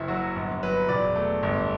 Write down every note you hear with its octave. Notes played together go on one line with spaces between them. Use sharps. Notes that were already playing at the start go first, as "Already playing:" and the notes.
Already playing: F#1 E4
F#3 F#4
G1
F#3 B4
E1 D5
A3
G1